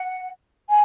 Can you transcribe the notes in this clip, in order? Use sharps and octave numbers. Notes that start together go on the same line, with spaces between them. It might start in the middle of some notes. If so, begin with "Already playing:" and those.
Already playing: F#5
G#5